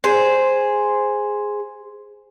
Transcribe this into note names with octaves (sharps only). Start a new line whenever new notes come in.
G#4 C5